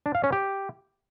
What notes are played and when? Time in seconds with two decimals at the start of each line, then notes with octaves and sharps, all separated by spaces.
0.06 D4
0.15 F5
0.24 C#4
0.32 G4